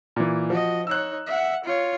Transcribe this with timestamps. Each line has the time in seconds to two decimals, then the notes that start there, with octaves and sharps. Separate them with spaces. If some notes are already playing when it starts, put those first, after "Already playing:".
0.16 A#2 E3
0.50 F3 F#4 D#5
0.87 D#4 C#5 E6 F#6
1.27 E5 F#5
1.64 F4 C#5